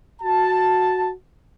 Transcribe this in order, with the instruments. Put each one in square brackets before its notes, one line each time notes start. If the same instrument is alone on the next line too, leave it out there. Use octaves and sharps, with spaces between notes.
[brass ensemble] F#4 A5